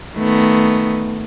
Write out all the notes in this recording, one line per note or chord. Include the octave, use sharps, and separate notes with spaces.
D#3 A3 B3